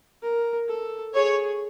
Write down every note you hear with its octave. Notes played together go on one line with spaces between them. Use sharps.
A#4
A4
G#4 C#5